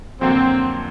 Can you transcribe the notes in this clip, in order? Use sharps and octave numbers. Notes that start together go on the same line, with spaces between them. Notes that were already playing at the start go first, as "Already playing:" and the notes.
F2 D3 F#3 A#3 C4